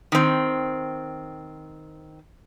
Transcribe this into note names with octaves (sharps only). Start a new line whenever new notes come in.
D#3 C4